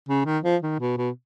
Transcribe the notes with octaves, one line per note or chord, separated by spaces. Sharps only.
C#3
D#3
F3
D#3
B2
B2